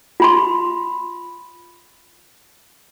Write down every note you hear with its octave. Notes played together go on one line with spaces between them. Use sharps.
F4 B5 C6